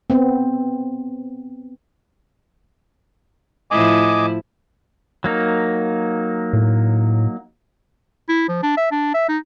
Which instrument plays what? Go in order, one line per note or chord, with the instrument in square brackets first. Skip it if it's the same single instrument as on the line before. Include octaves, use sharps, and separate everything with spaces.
[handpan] B3 C4
[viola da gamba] A2 F3 E4 [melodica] D#5 G#5 D6
[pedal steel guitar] F#3 A#3 D#4
[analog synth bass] A2
[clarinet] E4
F3
D4
E5
D4
E5
D#4